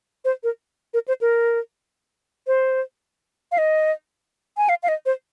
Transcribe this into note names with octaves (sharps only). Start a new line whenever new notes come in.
C5
A#4
A#4
C5
A#4
C5
F5
D#5
G#5
F5
F5
D#5
C5